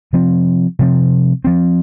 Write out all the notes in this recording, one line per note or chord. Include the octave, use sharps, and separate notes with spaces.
C3 F3 C4
C3 F3 C4
F3 C4